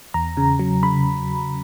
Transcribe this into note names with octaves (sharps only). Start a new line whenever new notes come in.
E2 A#5
C#3
F#3
C#3 B5